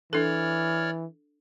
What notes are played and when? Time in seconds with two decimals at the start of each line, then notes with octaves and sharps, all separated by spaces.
0.13 E3 D4 A4 C#5 D5 F6